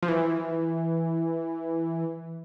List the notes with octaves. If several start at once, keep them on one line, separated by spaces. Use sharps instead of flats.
F3
E3